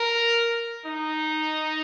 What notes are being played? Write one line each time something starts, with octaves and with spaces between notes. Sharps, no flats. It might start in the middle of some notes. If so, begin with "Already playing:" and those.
Already playing: A#4
D#4